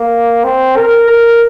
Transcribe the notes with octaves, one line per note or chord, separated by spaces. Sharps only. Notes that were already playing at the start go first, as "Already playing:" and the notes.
Already playing: A#3
C4
A#4
A#4